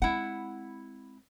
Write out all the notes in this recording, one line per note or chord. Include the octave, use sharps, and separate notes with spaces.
G#3 C4 E4 F#5